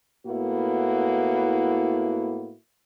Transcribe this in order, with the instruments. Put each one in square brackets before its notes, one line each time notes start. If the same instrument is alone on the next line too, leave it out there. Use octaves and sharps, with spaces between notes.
[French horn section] A2 A#3 B3 E4 F#4